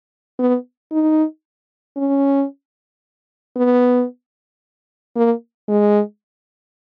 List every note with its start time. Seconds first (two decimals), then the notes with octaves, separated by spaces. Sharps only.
0.39 B3
0.92 D#4
1.97 C#4
3.56 B3
5.16 A#3
5.68 G#3